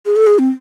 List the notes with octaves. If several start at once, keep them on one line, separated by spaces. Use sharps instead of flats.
G#4
A4
G#4
C4